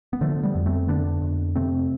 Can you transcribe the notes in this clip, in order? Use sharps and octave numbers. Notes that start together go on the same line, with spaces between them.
B3
D3 F3 A3
G3 B3
F2
A3 C4
D3 B3 D4
F2
C3 A3 C4